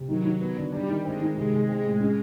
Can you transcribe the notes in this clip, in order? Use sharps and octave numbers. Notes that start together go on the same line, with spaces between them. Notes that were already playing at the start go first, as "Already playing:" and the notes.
Already playing: C3
D#3 F#3
D#3
B3
D3
G3 D4
D#3
G#3 C4
D#3
C3 G#3
C3
C4
A2
C#4